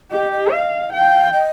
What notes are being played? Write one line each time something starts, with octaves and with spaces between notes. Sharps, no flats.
G4 D#5
D#5
D#5 F5
F5 G5
D#5